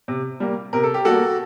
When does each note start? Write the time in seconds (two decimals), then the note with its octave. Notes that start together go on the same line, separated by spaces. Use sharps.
0.08 C3
0.40 G3 A#3
0.73 C3 A#4
0.84 A4
0.94 G4
1.05 G3 F#4 A4
1.10 A#3